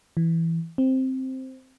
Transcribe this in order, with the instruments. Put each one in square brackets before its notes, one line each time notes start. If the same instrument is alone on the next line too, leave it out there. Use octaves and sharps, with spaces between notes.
[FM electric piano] E3
C4